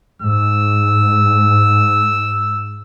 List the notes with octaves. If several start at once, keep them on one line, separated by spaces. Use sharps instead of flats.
G#2 E6